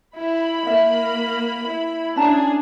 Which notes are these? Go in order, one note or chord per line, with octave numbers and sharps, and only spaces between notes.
E4 B5
A#3 E5
E4
C#4 D4 G#4 A5 A#5